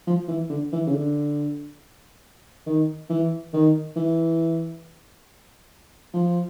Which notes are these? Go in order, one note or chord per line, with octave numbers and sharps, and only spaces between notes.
F3
E3
D3
E3
C#3
D3
D#3
E3
D#3
E3
F3